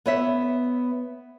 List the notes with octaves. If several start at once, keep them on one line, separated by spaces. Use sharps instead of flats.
B3 C#5 E5